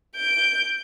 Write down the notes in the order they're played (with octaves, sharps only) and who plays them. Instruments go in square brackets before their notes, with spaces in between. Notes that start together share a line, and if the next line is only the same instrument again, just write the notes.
[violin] G6 D7